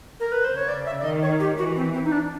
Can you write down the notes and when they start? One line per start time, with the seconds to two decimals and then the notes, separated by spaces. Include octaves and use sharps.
0.20 A#4
0.32 B4
0.44 C5
0.50 C#3
0.56 C#5
0.68 D5
0.86 E5
0.99 D5
1.04 D#3 D#5
1.22 C#5
1.40 G4
1.58 E3 F#4
1.76 C4
1.94 C4
2.04 D#4
2.12 D4